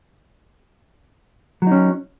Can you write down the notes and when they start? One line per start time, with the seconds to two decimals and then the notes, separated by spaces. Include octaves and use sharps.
1.62 F#3
1.67 D#4
1.72 C#4